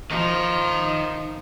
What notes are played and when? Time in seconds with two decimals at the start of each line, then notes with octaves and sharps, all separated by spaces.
0.11 D#3 F3 D#4